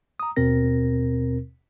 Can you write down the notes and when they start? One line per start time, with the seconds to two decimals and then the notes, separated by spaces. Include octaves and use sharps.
0.20 A#5 D#6
0.36 D#2 B2 C4 A#4 A#6